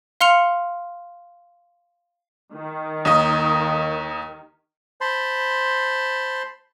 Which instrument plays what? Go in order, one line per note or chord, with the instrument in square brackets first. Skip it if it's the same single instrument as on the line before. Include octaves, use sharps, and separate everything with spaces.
[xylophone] F5 C6 F6 C#7 F7
[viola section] D#3
[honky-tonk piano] D#2 D#5
[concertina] C5 A5 B5 C6